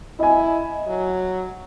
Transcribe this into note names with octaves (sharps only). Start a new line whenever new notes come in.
E4 D#5 G#5
F#3